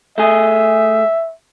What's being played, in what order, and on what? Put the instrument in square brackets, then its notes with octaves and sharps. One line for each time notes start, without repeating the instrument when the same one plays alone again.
[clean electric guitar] A3 G#4 [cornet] E5